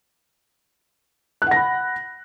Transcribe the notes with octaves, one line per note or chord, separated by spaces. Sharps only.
F#5 B5 F#6 A#6